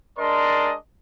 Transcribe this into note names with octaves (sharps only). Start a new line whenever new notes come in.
G#3 D4 A#4 D5 D#5 C6